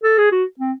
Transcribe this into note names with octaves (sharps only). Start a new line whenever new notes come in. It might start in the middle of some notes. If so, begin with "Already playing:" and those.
A4
G#4
F#4
C4